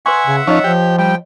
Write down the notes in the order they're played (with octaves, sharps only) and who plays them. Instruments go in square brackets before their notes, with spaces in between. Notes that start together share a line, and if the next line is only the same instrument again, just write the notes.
[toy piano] B4 C6 C#6 [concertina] E5 F#5 [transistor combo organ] G#5
[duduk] C#3
[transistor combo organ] F3 C#4 [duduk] D#4 [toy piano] C#5 D#5
[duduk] F3 [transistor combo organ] G4
[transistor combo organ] G3 [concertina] G5